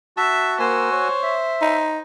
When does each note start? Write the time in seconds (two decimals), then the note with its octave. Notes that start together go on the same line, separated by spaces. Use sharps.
0.17 F#4 E5 A5
0.60 A#3 F#4 C5 G#5 E6
0.92 C#5
1.23 E5
1.61 D#4